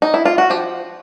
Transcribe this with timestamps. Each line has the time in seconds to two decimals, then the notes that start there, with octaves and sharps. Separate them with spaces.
0.02 D#4
0.14 E4
0.25 F4
0.38 F#4
0.50 F3 G4